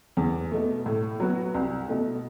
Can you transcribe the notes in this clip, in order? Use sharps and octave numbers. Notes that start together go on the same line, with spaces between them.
E2
B2 A3
A2
F#3 B3 F#4
C2
B2 A3